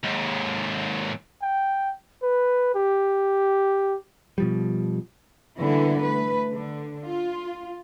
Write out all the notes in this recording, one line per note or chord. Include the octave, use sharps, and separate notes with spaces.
D#2 G#2
G5
B4
G4
B2 F3 G3
D3 E3 G3 A#3 B3 E4
A3 B4
D3
F4